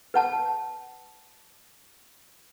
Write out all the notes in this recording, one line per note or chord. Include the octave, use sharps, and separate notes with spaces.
B4 F#5 A5